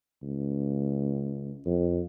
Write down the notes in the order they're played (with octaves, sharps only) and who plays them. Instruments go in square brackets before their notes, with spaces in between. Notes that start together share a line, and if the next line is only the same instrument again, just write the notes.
[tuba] C#2
F2